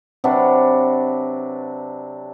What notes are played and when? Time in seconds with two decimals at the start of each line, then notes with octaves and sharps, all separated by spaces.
0.24 C3 F#3 D4 B4